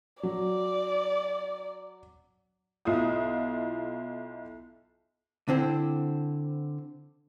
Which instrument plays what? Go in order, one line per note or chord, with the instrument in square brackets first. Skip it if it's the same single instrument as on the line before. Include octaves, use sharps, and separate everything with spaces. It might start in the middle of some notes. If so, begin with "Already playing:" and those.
[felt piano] F#3 [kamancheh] D5
[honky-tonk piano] B1 E4 F4 D#6
[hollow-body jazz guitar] D3 C4 E4